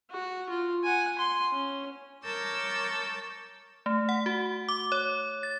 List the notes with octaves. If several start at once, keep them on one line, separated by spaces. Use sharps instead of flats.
F#4
F4
F#5 G#5
C6
C#4
A#4 C#5 A5 D6 E6 G6
A3
F#5
F#4
D6
C#5
A6